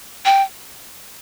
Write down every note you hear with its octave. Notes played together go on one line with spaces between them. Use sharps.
G5